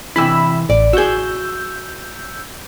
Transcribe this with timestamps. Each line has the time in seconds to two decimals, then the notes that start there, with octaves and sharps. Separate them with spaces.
0.16 C3 E3 E4 B5 E6
0.70 A1 D5
0.93 F#4 G#4 E6 G6